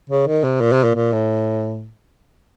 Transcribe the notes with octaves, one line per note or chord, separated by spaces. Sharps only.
C#3
D#3
C3
A#2
C3
A#2
A#2
A2